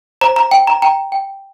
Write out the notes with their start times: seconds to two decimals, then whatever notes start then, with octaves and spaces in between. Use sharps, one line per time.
0.21 C5 A#5
0.36 A#5
0.51 G5
0.67 A#5
0.82 G5 A#5
1.12 G5